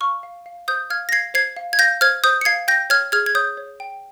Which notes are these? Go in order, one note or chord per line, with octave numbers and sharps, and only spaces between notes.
F5 C#6 F6
F5
F5
C5 D#6 G6
F5 F6 G#6
A#6
F5 G#6 C7
C5 G#6 C7
F5
G#6
F5 G6 A#6
C5 F6 G#6
C5 D#6 G6
C#7
F5 G#6 C7
G5 G6 A#6
C#5 F6 G#6
G#4 F6 G#6
G#6
C#5 D#6 G6
C#5
G5